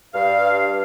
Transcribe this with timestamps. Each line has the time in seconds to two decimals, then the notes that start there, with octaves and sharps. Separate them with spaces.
0.14 G2 F5